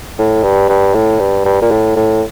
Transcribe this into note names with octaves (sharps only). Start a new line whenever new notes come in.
A2
G2
G2
A2
G2
G2
A#2
A2
A2